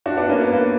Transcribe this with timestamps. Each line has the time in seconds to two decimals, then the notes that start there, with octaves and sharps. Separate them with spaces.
0.06 D4 F#4
0.17 B3 D4
0.29 A#3 C#4
0.41 B3
0.53 A#3